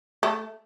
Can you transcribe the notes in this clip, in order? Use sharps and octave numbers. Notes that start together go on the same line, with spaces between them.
A3